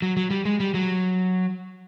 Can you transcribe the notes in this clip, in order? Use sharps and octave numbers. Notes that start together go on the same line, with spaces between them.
F#3
F#3
G3
G#3
G3
F#3